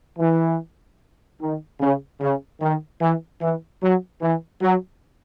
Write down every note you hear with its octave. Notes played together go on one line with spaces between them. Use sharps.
E3
D#3
C#3
C#3
D#3
E3
E3
F#3
E3
F#3